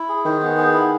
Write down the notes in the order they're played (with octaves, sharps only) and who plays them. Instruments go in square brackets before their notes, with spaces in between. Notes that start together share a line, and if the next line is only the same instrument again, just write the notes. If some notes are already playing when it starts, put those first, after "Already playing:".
Already playing: [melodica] E4
G#4
[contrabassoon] D#3 [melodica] C5
[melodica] B3
G#4
E4